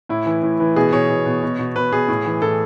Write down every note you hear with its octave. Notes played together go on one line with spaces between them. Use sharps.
A2 E4
E3
A2
E3
B2 G#4
B2 C#5
B2
B2
B2
B2
B2 B4
B2 G#4
A2
E3
A2 A4